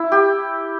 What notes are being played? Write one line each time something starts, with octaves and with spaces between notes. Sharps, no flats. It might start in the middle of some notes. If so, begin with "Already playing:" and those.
Already playing: E4
G4